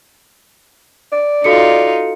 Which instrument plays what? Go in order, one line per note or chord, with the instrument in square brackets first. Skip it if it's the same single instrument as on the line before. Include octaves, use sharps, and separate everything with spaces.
[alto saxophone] D5
[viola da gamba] D#4 F4 [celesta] F#4 A4 C#7